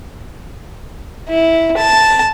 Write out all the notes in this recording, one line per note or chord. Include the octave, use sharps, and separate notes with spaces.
E4
A5